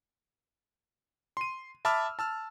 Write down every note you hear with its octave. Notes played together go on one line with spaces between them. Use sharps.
C6 D#7
E5 A5 B5 D6 E6 F6
A5 E6 F6